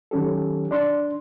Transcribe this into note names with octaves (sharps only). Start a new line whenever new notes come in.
D#3 F#3 C#4 G4 A4
D4 D5 C6